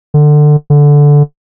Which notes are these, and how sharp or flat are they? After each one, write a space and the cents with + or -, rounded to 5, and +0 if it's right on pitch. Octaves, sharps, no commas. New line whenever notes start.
D3 +20
D3 -10